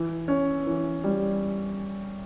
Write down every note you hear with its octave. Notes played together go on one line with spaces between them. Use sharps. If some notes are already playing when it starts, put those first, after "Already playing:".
Already playing: E3
C#4
E3
G3